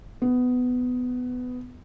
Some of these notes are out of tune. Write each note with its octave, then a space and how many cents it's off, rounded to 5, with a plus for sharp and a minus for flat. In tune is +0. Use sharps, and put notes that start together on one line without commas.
B3 +15